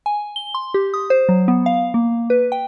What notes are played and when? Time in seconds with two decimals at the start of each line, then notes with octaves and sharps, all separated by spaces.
0.06 G#5
0.36 G7
0.54 C6
0.74 G4
0.94 D#6
1.10 C5
1.29 F#3
1.48 B3
1.66 F5
1.94 A#3
2.30 B4
2.52 G5